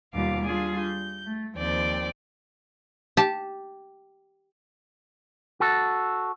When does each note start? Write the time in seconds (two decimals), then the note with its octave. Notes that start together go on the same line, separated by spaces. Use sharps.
0.14 D#2 B2 G3 F4 F5 D6
0.44 G3 D4 F4 G#4
0.79 G6
1.27 A3
1.57 D#2 F3 C4 D5 G5
3.17 G4 A5
5.60 F#4 A4